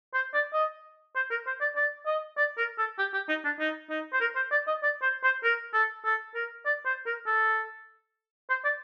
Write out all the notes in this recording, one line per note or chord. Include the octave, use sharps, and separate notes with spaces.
C5
D5
D#5
C5
A#4
C5
D5
D5
D#5
D5
A#4
A4
G4
G4
D#4
D4
D#4
D#4
C5
A#4
C5
D5
D#5
D5
C5
C5
A#4
A4
A4
A#4
D5
C5
A#4
A4
C5
D5